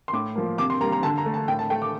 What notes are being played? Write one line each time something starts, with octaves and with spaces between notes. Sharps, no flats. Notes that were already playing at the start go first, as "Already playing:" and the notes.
C6
A2 D6
F3 A#3
C3 D6
C6
G3 A#3 A#5
A#5
D3 A5
A#5
A3
A5
A2 G5
A5
A3 G5
D6